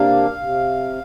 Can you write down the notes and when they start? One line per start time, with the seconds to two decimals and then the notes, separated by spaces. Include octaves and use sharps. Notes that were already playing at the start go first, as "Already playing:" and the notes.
Already playing: C3 A#3 D4 F5
0.41 C3